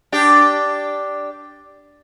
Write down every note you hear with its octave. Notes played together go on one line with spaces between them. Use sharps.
D4 G4